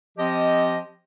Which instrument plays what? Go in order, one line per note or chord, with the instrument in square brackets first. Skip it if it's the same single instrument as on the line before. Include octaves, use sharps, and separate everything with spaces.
[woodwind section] F3 C4 G4 D#5